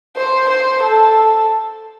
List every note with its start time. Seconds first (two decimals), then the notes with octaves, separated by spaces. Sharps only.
0.17 C5
0.50 C5
0.83 A4